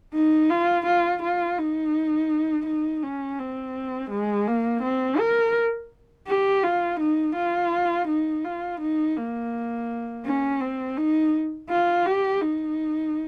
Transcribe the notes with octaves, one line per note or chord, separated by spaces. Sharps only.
D#4
F4
F4
F4
D#4
D#4
C#4
C4
G#3
A#3
C4
A#4
G4
F4
D#4
F4
D#4
F4
D#4
A#3
C#4
C4
D#4
F4
G4
D#4